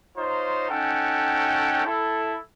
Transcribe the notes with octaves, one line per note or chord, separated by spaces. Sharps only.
D#4 F4 C5 C#5 A#5
C#4 D#4 A4 F#5 G5
E4 A4